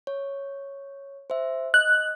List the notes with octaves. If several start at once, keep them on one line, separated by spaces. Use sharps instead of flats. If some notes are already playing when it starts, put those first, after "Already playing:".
C#5
C5 E5
D#5 F#6